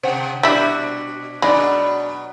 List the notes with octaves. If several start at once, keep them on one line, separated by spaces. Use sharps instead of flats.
C3 C5 F#5 G5
B2 G3 D4 E4 F#4 B6
B2 F#3 G#3 D4 B5